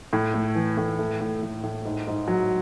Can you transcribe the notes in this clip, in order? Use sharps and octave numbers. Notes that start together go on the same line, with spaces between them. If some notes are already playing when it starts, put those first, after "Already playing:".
A2
A3
E3
A2
A3
A2
A2
A2
G#2
G#2
F#3